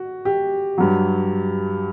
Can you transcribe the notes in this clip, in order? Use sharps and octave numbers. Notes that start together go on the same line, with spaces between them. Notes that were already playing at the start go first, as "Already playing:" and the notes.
Already playing: F#4
G4
G2 F#3